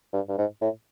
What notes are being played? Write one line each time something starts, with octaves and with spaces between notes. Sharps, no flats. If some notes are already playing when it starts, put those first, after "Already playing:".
G2
G2
G#2
A2